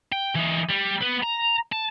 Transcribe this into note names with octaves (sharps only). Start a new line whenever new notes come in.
G5
E3 D#4
G3
B3 B4
A#5
A5